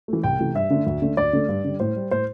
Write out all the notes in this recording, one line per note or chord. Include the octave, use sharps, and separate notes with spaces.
E3 A3
C2 G5
C3 E3 A3
G2 E5
D3 A3
D2
D3 A3
D2 D5
D3 A3
G2
D3 G3
A2 C5
G3
A2 C5